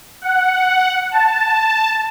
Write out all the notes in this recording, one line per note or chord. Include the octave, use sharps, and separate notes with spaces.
F#5
A5